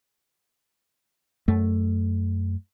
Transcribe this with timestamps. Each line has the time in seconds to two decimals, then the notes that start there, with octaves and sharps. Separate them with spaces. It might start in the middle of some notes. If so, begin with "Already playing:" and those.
1.48 F#2 A3